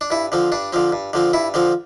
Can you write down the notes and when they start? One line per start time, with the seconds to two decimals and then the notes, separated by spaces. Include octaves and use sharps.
0.01 D4
0.10 G2 E4
0.32 D3 F3 C4
0.52 G2 D4
0.73 D3 F3 C4
0.92 G2
1.13 D3 F3 C4
1.33 G2 E4
1.54 D3 F3 C4